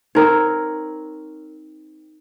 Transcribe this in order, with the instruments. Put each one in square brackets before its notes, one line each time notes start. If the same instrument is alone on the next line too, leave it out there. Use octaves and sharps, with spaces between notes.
[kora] C4 A#4 C#5 [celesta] D#4